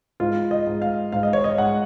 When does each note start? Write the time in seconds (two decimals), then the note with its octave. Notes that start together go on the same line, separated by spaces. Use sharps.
0.20 G#2 F4
0.51 D#5
0.67 G#2
0.82 F5
1.12 G#2 F5
1.23 D#5
1.33 C#5
1.44 D#5
1.58 G#2 F#5